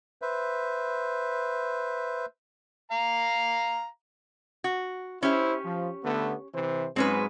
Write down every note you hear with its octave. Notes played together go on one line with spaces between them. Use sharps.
B4 C5 E5
F5 A#5
F#4
C#4 E4 G4 C5
F3
D3 A3 B3
C3 E3 C5
G#2 F#3 G#3 C4 C#4 B4